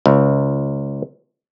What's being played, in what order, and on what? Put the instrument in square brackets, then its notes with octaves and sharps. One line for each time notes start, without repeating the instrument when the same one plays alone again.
[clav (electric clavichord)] C#2